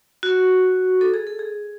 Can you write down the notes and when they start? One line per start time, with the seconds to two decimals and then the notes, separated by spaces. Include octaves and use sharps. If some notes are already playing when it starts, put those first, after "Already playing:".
0.23 F#4
1.01 A4
1.14 G#4
1.27 A4
1.39 G#4